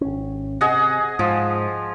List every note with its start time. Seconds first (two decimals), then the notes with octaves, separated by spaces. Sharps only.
0.01 G#1 C#4
0.61 C3 G#4 D#5 F#5
1.19 G#2 F3